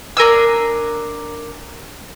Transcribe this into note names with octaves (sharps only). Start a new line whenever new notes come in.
D4 A#4 G#5 E6